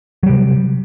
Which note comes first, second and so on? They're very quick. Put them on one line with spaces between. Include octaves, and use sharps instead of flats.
F#3 G3 C3